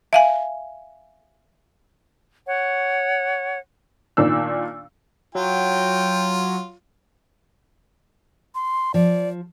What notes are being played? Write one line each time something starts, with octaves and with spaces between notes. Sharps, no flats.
E5 F5 G#5
C#5 F#5
A#2 D#3 D4 E6
F#3 F4 G5
C6
F3 D5